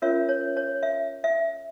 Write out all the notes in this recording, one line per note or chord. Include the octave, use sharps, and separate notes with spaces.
C#4 F4 A#4 C#5 E5
C#5
C#5
E5
E5